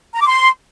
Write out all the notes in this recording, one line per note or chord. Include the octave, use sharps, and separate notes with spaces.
A#5
D6
C6